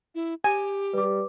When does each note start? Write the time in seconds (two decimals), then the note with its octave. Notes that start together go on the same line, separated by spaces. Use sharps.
0.15 E4
0.44 G4 G#5
0.94 G3 B4 D6